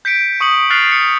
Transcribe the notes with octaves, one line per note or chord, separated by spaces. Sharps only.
G6 B6 C#7 D7
C#6 D#6 C#7 F#7
F6 F#6 A6 C7 F7
C#7